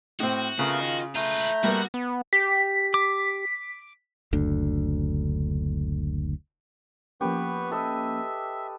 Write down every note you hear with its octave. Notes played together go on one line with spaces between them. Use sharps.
A2 C4 F#4
C#3 A3 B3 F4 A#4
D#3 D#5
A3 F4 B4 E5 A#5 G6
G3 A#3 B3 F#4 F#5
B3
G4 B6
D6
F#1 D2 D3
F3 A#3 B3 C#4 G4 B4 C#6
A4 B4 D#5 E5